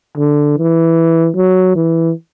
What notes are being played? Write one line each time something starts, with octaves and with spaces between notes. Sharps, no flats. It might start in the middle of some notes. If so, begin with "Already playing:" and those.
D3
E3
F#3
E3